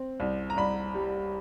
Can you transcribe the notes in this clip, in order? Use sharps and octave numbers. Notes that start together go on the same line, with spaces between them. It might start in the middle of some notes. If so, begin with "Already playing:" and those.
Already playing: C4
C2
A#5
C2 B5
G3